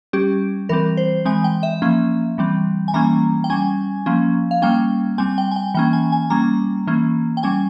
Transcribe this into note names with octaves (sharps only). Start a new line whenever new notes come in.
G3 C#4 G4
E3 G3 C4 A#4
C5
E3 G#3 C4 G#5
G5
E5
F3 A#3 C#4
E3 G3 C4
G#5
E3 G3 A#3 C#4 A#5
G5
G3 C#4 G#5
F3 A#3 C#4
F5
G3 A#3 C#4 G5
G3 C4 G#5
G5
G#5
G5
E3 A#3 C#4 G5
G#5
G#5
G3 A#3 C#4 A#5
E3 A#3 C#4
G5
G3 C#4 G#5